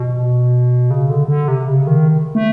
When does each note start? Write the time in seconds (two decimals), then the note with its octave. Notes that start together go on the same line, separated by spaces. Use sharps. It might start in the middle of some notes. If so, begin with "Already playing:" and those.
Already playing: B2
0.90 C#3
1.10 D3
1.28 D3
1.48 C3
1.68 C#3
1.87 D#3
2.35 A3